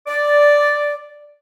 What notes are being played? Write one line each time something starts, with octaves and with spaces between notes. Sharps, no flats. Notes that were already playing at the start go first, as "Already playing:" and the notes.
D5